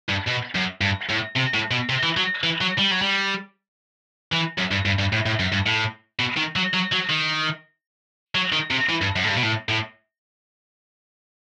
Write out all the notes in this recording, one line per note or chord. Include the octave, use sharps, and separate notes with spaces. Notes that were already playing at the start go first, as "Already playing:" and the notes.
G2
B2
F#2
G2
A2
C3
A2
B2
C3
E3
F#3
E3
F#3
G3
F#3
G3
E3
F#2
G2
G2
G2
A2
A2
F#2
G2
A2
B2
D#3
F#3
F#3
F#3
D#3
F#3
D#3
C3
E3
G2
F#2
A2
G2
B2
A2
A2